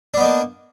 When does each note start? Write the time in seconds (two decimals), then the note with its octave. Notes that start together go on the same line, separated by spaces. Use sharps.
0.14 D4
0.17 B3
0.21 D#4
0.24 A#3